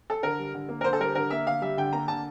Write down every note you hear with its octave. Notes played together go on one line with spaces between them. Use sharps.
A4
D3 A#4
G3
D3
A#3
A#4
D3 C5
A4
G3 A#4
D3 A#4
A#3 E5
D3 F5
G3 E5
D3 G5
A#3 A#5
D3 A5